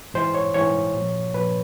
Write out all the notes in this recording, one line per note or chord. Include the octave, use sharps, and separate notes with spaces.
G#2 E3 C5
C#5
G#2 E3 C#5
A#2 F3
A#2 F3 B4